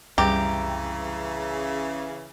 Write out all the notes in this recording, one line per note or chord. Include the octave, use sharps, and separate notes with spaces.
C2 F#2 C#3 E3 G3 G4 A#5